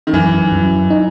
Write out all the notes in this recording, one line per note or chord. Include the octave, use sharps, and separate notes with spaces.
D#3
F#2 E3
F#2
D#4